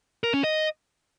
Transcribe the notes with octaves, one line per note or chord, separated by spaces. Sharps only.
A#4
C#4
D#5